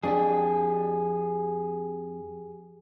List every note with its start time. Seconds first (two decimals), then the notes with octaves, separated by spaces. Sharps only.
0.03 F2 D4 G4 G#4